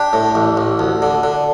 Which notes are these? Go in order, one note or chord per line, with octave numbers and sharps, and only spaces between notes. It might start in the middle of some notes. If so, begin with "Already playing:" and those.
Already playing: D4 G4
A2
A1
A1
D2
D3
D3